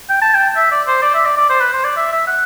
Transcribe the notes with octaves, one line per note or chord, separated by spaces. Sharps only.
G5
A5
G5
E5
D5
C5
D5
E5
D5
D5
C5
B4
C5
D5
E5
E5
F#5